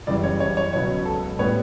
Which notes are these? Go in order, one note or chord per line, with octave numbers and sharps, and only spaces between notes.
F#2 C#3 E3 G3 D5
C#5
C#5
C#5
C#2 B2 F#3 C#5
A4
A2 G3 B3 C#5